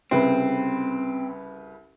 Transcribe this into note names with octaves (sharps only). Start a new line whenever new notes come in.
C2 C#3 C4 B4